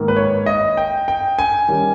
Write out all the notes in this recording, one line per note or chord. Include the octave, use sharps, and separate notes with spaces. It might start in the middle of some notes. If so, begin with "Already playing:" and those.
Already playing: G#2 D#3 A#3
B4
C#5
D#5
G5
G5
G#5
D#3 G3 C#4